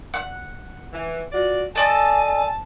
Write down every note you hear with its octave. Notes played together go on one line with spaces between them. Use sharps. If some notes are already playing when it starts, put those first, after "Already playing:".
F#5
E3
F4 F#4 D5
A4 D5 D#5 G#5 A5